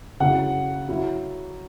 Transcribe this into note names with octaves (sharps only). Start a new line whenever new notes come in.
C#3 F#3 E4 F#5
F#3 E4